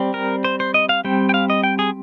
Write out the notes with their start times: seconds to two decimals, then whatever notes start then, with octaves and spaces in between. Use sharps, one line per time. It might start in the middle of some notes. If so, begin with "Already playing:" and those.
Already playing: G3 C4
0.14 A#4
0.44 C5
0.60 C5
0.74 D#5
0.89 F5
1.05 G3 C4 G5
1.29 G5
1.34 F5
1.50 D#5
1.64 G5
1.79 G#4